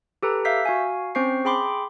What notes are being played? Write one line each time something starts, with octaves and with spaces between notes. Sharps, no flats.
G4 A4 B4 A#5
E5 F5 E6 G6 B6
F#4 F5 G#5
C4 C#4 C5 C#6 C7
G#4 G5 B5 C6 D6